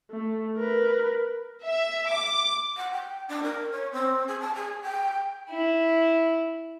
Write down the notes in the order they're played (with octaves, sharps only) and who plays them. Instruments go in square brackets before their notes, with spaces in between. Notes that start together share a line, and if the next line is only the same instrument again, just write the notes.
[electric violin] A3
A#4 B4
[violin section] E5
D6
[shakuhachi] F#5
G5
D4
A#4
C#5
C4
G#4
A5
G#4
G5
[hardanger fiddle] E4